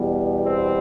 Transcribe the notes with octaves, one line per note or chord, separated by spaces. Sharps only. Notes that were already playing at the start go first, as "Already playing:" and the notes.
Already playing: E2 B2 G3 B3
C4